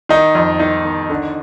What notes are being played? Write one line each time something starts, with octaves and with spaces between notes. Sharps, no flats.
D#3 D#4
F2
D#3 D#4
D#3
D3